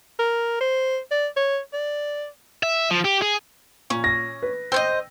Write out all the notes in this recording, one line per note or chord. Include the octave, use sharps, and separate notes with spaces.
A#4
C5
D5
C#5
D5
E5
F3
G4
G#4
A#2 C#4
A#6
B4
C5 C#5 D#5 G5 E6